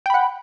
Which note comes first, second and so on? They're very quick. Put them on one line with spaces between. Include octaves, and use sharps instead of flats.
G5 B5 F#5